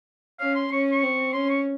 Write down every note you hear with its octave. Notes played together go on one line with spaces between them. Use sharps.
C#4 F5
C6
C#4 C#6
C#6
C4
C#4 C6
C#6